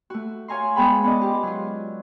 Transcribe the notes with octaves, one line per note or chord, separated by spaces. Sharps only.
A3 F#4
C#5 F5 G#5 A#5 C6
G#3 B3 G#4 G5 B5
B3 C#4 D5 D#5
F4 G4
F#3 F4